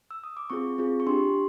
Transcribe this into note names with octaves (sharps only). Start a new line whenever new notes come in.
E6
D#6
D6
C4 F4 G#4 C#6
C4 F4 G#4
C#6
D4 G4 C6